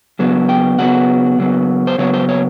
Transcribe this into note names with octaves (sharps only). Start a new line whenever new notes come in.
C#3 F#3 B3
G5
C#3 F#3 B3 F#5
C#3 F#3 B3
C5
C#3 F#3 B3 C#5
C5
C#5